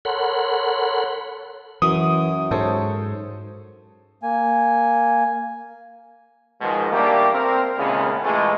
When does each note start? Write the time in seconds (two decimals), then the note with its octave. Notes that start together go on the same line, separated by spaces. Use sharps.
0.05 A4 A#4 C#5 F#5 B5 C6
1.82 F#2 E3 D#6
2.51 G#2 A4 C5 C#5
4.23 A#3 G#5
6.61 G#2 B2 D#3 F3 G#3
6.92 G3 A3 A#3 D4 G4
7.34 C4 A#4
7.78 D#2 A#2 C#3 G#3 A3 B3
8.23 A#2 E3 G#3 A3